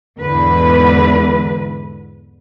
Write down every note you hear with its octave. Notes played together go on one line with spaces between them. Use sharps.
E2 G#2 D3 B4